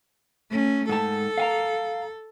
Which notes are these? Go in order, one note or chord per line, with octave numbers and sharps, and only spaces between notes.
A3 C#4
G#2 A4 A5
F5 G#5 A#5